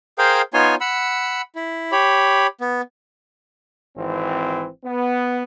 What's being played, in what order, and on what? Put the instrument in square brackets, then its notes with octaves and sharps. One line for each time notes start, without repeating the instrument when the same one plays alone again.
[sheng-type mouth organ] G#4 A#4 C5 F5 G5
B3 D#4 F4 C#5 G#5 C6
F#5 B5 E6
E4
G4 C#5 B5
B3
[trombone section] G#1 E3 C4
B3